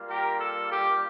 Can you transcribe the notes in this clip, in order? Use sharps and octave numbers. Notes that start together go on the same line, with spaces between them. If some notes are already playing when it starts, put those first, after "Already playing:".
Already playing: G3 A#3 F4
G4 A#4
A4
G4